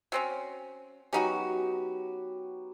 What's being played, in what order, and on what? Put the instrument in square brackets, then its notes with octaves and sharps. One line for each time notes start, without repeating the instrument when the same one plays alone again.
[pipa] F#3 C4 C#4
[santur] F#3 B3 G4 [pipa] C#4 D#4 F#4